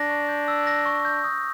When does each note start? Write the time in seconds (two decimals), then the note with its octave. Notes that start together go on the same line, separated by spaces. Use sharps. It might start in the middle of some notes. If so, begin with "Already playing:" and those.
Already playing: D4 A#6
0.10 C#6
0.28 G6
0.48 E6
0.67 A#6
0.86 C#6
1.05 G6
1.24 D#6